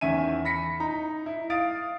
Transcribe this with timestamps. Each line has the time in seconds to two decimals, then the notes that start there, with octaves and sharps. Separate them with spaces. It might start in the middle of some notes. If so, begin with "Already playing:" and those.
0.01 E2 D#3 C#4 E5 G#5 D#7
0.45 B5 A#6 B6 C#7
0.80 D#4 A#5
1.26 E4
1.50 F5 D#6 A6 D7